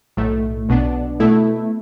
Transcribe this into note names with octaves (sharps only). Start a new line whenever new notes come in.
B1 A2 A3
B1 B2 B3 D4
B2 A3 E4